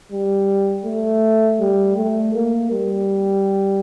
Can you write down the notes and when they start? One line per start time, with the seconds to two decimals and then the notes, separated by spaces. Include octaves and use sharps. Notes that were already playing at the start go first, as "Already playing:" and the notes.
0.12 G3
0.85 A3
1.60 G3
1.97 A3
2.34 A#3
2.71 G3